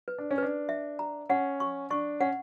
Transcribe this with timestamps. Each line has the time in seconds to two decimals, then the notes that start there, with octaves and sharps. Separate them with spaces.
0.08 B4
0.18 D4
0.31 C#4
0.38 D4 B4
0.69 E5
0.99 A#5
1.29 C#4 F#5
1.60 C#6
1.90 D4 C#6
2.20 C#4 F#5